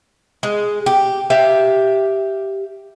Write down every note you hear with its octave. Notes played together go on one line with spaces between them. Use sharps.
G#3
G4
G4 E5 F5